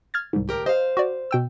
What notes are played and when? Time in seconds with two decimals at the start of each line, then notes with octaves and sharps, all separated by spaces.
0.14 F6 G#6 A6
0.33 C2 G#2
0.48 D2 G4 A#4
0.66 C5 D#5 F5
0.97 F#4 D5
1.31 B2 G5 E6